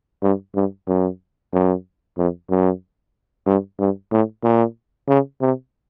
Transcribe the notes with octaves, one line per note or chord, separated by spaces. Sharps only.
G2
G2
F#2
F#2
F2
F#2
G2
G2
A2
A#2
C#3
C3